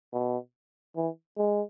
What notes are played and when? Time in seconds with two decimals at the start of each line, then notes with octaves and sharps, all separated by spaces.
0.13 B2
0.96 E3
1.37 G#3